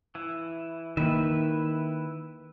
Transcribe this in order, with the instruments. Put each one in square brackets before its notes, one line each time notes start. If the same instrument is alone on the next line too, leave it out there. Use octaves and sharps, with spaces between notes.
[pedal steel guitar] E3 E4
[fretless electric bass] D#3 A#3 [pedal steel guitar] E4 B4 E5